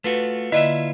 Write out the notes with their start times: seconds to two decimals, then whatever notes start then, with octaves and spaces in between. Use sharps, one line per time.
0.04 A3 F4 F#4 B4
0.52 D3 A#3 E4 F4 D#5 E5